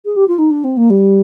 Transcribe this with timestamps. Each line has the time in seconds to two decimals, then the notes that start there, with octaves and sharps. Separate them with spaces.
0.05 G#4
0.16 G4
0.27 F4
0.38 D#4
0.50 D4
0.64 C4
0.77 A#3
0.90 G3